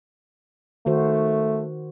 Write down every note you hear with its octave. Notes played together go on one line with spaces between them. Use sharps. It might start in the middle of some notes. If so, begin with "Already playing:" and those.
D#3 A3 F#4 C5